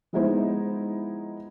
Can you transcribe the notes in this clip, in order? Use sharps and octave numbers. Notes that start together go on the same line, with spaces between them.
F3 G#3 B3 D#4 E4 C5